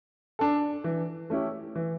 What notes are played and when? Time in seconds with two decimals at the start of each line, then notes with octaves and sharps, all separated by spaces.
0.39 D4 A4
0.84 E3
1.30 A3 C#4 E4 G4
1.75 E3